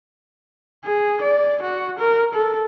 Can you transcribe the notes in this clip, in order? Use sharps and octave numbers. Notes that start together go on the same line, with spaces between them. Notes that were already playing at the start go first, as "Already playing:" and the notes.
G#4
D5
F#4
A#4
A4